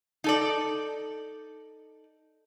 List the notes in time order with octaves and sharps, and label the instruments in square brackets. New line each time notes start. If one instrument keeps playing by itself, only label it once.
[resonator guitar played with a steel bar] D#4 A4 D5